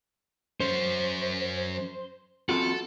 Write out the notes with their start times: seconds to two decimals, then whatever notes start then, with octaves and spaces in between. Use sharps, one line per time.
0.60 F#3 C#4 C5
2.49 C4 F4 F#4 A4